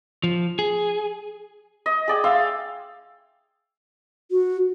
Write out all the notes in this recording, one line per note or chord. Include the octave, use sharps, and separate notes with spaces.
F3
G#4
D#5
G#4 D5 G5
E5 F5 C6
F#4